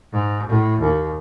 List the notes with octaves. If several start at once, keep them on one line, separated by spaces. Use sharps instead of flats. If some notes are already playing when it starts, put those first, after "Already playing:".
G#2
A2
D#2